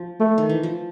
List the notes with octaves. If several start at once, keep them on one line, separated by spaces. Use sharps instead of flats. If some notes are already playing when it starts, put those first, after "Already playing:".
Already playing: F3
A3
D#3
E3
F3